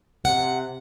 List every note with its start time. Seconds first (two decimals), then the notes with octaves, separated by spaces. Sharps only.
0.25 C3 F#5